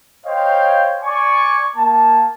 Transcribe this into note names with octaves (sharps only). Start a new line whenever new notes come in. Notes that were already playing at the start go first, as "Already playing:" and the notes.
C5 C#5 D#5 F5 G5
D5 G#5 C#6
A#3 A5